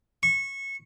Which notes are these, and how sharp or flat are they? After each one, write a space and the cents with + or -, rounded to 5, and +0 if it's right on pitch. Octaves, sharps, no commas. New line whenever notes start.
C#6 -20